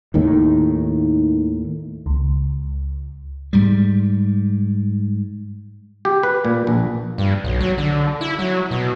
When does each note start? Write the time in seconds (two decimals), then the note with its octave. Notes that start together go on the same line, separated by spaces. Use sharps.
0.14 D#2 A2 D#3
2.06 C#2
3.53 G#2 G3
6.05 G4
6.23 B4
6.45 A#2
6.67 A#1
7.18 G2
7.44 B1
7.61 F#3
7.78 D3
8.21 E4
8.39 F#3
8.71 B2